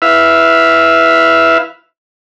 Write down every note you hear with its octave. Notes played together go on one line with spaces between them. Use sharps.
E4 B4 E5 F5